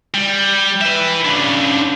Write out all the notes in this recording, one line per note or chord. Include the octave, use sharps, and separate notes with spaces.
G3
B4 E5
C#3 D4